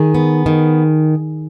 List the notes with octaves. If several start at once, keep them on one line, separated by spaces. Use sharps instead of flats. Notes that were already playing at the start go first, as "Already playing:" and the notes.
Already playing: D#3 G#4
B3
D#3